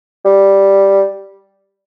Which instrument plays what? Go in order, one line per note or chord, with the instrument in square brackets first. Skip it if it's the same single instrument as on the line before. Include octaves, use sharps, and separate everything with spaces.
[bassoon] G3